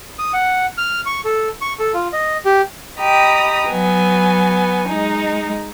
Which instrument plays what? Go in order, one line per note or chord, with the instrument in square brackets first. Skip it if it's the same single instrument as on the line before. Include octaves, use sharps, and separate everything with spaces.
[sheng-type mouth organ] D#6
F#5
F6
C#6
A4
C#6
A4
F4
D#5
G4
[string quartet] G4 D#5 G5 A#5 B5 D#6
F#3 B3 G#5
G#3 D#4